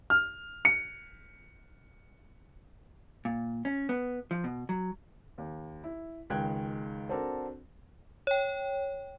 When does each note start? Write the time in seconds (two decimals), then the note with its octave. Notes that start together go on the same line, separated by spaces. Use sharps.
0.10 F6
0.65 C#7
3.25 A#2
3.65 C#4
3.89 B3
4.31 F3
4.44 B2
4.69 F#3
5.38 D#2
5.84 E4
6.30 C#2 D#3 G#3 G5 F#6 G#6
7.09 C4 D4 F#4 A4 A#4
8.27 C#5 G5